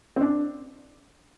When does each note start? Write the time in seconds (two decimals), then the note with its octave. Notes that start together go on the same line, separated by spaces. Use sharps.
0.16 C4
0.21 D4